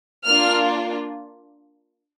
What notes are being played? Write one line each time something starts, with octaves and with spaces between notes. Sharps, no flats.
A#3 D4 F4 F6